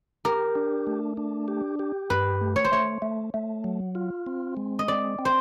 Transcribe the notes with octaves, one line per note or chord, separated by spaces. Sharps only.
G4 A#4
D4
A3
D4
G4
G4
G2 B4
A3
C#5
C5
A3 C#5
A3
A3
F#3
F4
C4
G#3
D#5
C4 D5
C4
C5